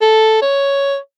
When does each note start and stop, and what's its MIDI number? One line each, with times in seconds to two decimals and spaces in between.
0.02 0.39 69
0.42 0.97 73